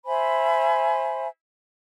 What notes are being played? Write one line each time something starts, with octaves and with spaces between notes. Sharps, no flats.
C5 E5 G#5 B5